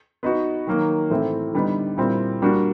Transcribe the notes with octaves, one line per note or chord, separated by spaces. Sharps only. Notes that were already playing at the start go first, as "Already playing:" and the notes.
B3 D#4 F#4
D#3 F#3 A#3
A2 E3 A3 C4 E4
D3 G3 B3 D#4
A#2 G3 C4 E4
G3 A#3 D4 F#4